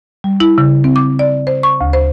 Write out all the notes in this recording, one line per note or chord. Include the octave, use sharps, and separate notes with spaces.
G3
E4
C#3
C4
D6
D5
C5
C#6
D2
C5